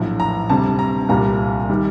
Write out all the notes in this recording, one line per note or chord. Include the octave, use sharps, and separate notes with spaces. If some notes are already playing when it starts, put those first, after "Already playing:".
Already playing: A#1 A2 F#3
A#5
D2 C3 G3 A5
A#5
C2 A#2 G3 A#5
D#3 G3